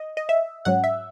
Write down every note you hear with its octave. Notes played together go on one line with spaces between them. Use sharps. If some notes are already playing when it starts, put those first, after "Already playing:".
Already playing: D#5
D#5
E5
G#2 F#3 C#4 F#5
E5